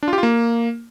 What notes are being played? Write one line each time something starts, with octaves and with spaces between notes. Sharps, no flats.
D4
F4
G4
F4
A#3